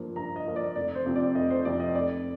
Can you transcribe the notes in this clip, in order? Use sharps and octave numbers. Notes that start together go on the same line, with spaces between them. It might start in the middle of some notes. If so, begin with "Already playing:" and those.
Already playing: G2 F3 A#3
G2 A#5
D#5
F3 A#3
D5
F1 D5
C5
F2 C3 F3
D5
F1 D#5
C5
F2 C3 F3 D5
D#5
F1 D5